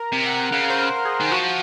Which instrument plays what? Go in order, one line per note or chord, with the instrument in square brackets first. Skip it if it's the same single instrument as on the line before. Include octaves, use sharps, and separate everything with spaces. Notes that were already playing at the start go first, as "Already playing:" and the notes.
Already playing: [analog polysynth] A#4
[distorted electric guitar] C3
[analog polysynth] F#5
[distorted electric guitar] C#3 [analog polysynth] F5
[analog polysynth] C5
A#4
G#4
[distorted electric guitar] D#3
[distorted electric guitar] F3 [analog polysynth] F#4